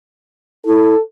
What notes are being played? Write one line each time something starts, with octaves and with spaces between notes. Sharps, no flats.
E4 A4